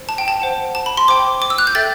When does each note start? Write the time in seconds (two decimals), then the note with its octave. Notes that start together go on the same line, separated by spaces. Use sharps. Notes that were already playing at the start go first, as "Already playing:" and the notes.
Already playing: C5
0.09 A5
0.18 G5
0.28 A5
0.42 C5 F#5
0.75 A5
0.86 B5
0.97 C6
1.08 C5 G5 D6
1.42 D6
1.50 E6
1.58 F#6
1.67 G6
1.75 A4 E5 G5 A6